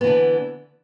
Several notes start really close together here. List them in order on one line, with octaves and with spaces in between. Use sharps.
B3 E3 D3